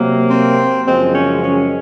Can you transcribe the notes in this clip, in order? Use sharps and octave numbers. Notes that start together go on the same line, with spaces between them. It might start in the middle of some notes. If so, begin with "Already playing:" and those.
Already playing: C3 F#3 A#3
C4
F#2 C#3 F3 G#3 C4
C#4
C#4